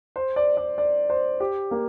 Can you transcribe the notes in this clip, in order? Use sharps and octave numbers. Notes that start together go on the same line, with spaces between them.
C5
D5
D5
D5
C5
G4
A#3